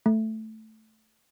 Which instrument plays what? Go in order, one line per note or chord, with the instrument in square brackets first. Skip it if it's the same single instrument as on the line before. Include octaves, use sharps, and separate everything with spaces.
[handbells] A3